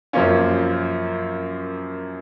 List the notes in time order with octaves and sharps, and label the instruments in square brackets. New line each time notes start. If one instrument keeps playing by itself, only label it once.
[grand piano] F#2 F3 A#3 C#4 F4